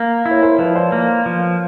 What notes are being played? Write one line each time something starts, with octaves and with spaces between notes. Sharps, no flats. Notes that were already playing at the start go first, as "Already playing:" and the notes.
Already playing: A#3
E4
C#5
A#4 C5
F3 B4 C#5
C5 D5
A#3
F3